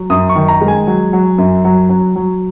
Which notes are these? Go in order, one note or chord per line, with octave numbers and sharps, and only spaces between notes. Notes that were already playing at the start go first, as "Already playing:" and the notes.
Already playing: F#3
F#2 D#6
C#6
D#3
A#5
G#3
G#5
F#3
F#3
F#2
F#3
F#3
F#3